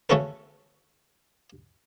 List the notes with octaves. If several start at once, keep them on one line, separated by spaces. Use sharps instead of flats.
C#3 A3 C#4 F#4 A4 B4